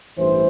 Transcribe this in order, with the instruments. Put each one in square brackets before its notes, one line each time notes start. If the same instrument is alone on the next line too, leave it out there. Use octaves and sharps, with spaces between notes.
[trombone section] A1 G2 E3 C5